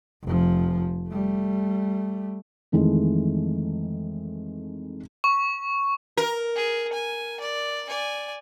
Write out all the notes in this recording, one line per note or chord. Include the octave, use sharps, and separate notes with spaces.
F1 F3
G3 A3
F2 D#3 E3 G#3 A3
C#6
A#4
G#4
G#5
D5
D5 G#5